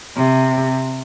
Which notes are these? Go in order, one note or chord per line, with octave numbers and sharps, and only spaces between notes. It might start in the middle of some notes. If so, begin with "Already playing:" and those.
C3